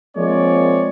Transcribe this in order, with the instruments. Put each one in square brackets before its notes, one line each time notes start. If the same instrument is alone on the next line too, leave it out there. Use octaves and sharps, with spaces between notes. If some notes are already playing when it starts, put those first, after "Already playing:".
[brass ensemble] F3 G#3 A#3 C4 C#5 D5